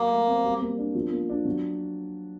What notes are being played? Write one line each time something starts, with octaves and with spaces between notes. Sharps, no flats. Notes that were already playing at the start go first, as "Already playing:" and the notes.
Already playing: F#3 A#3
A3
C4
G3
A#3
D4
F3
A#3
D4
F#3